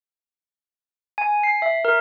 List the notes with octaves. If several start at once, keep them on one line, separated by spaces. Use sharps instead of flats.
G#5
C7
E5
A#4